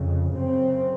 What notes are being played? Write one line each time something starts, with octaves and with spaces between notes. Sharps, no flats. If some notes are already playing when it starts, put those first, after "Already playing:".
Already playing: F2 C#3
F#2 C#3 C4